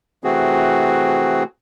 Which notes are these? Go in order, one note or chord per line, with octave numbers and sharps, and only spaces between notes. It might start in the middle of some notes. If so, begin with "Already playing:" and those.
C3 E3 A3 C4 F#4 G#4